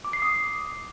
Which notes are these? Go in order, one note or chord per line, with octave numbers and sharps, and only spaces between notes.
D6
C7
D#6